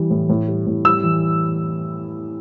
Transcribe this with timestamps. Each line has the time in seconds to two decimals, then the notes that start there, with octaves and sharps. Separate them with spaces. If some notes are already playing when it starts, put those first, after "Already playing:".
Already playing: E3 G3
0.10 A2
0.29 A2
0.48 G3
0.66 A2
0.85 G3 E6
1.03 E3